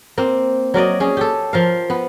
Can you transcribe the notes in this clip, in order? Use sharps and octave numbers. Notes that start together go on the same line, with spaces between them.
A#3 C4
F#3 A#4 D5 D#5
C#4 G#4
G4 A4
F3 A#4 F5
B3